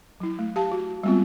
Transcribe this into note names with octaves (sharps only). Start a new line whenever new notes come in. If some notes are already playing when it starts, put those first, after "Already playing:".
F#3 E4
A3
G4 F5 A5
F#4
G3 G#3 B3 C4 F4